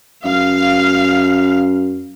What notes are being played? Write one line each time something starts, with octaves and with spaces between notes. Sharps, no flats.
F#2 F5